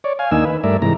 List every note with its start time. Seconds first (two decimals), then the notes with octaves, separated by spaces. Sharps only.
0.04 C#5 D5
0.19 F5 G#5
0.31 D#2 A#3 D4 D#4 G#5 E6
0.45 B4
0.64 G2 A3 A#4 D5 E5
0.82 G#2 C3 E3 A#5